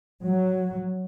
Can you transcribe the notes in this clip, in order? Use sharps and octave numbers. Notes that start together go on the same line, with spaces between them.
F#3